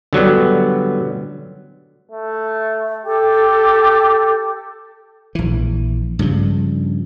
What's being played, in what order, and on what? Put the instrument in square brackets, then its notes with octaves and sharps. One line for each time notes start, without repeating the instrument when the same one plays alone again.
[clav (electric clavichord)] D3 F#3 G3 B3
[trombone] A3
[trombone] G4 [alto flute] A4
[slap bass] A#1 E3
G2 C#3 F3